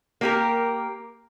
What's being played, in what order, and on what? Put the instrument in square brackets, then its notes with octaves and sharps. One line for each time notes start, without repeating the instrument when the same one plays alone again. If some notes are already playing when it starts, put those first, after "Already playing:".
[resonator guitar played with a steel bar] A#3 G4 A#4